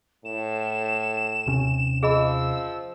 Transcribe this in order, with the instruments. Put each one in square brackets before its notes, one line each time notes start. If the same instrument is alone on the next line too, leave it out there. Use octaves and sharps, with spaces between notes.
[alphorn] A2 [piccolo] E7
[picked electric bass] D#2 C3 C#4
[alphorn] F3 [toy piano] G#4 D#5 B5 [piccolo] E6